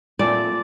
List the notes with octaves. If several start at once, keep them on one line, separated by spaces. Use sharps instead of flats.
A#2 A3 C4 D5